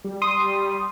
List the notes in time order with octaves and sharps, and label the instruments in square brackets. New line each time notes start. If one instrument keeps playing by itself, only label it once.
[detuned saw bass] G3
[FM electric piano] C6 D#6